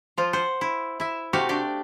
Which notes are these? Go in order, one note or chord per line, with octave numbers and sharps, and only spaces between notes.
F3 F4 C5
C5 F#5
E4
E4 E5
C3 A3 F#4 G4 F5
D4 G4 D5